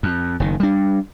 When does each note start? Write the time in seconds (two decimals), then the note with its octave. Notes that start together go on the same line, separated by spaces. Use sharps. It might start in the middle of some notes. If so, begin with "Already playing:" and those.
0.03 F2
0.40 F#1 D#3
0.60 G3 D4